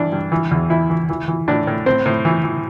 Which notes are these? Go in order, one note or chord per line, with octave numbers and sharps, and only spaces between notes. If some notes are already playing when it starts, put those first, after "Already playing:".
Already playing: G2 E3 D4
G2
E3
E2
E3 E4
E3
E3
E3
A2 D4
A2
A2 C4
A2
E3
E3